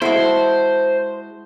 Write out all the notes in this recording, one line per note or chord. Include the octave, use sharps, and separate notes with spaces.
G#3 E4 F#4 A4 C5